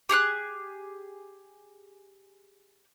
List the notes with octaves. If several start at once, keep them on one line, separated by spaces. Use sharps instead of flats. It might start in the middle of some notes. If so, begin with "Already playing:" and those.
G4 G#4 C#6 F#6